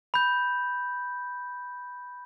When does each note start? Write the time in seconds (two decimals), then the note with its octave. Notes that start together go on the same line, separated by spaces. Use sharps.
0.14 B5 G6